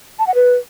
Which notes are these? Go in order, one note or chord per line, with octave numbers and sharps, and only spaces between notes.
A5
F#5
B4